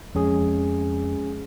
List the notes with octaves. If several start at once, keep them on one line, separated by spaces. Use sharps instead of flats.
F2 G#3 C#4 G#4